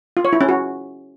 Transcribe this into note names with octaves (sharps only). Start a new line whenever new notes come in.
F4
C#5
E4
C#4
F#4